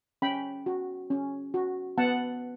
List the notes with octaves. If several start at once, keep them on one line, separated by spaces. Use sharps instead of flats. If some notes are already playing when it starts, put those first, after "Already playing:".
C#4 G5 B5
F#4
C#4
F#4
B3 F#5 A5